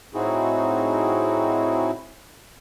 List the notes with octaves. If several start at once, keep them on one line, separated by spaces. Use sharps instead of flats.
A2 C4 D#4 E4 F#4 G#4